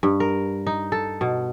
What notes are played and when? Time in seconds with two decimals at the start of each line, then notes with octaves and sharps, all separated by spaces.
0.03 G2
0.20 A#4
0.67 D#4
0.92 A4
1.21 B2